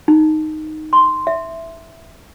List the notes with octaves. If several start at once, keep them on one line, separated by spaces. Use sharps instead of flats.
D#4
C6
E5